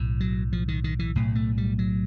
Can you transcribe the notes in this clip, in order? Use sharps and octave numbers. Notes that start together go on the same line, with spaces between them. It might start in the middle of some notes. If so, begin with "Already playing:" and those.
Already playing: B1 A2
F#3
F3
D#3
D#3
E3
B1 A2
A3
G3
F#3